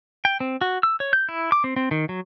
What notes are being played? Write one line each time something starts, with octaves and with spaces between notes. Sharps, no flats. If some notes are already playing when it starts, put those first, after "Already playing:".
G5
C4
F#4
E6
C#5
G6
E4
D6
C4
C4
D#3
F#3